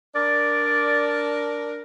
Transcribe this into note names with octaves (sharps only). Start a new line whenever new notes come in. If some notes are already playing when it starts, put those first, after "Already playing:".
D4 A#4 D5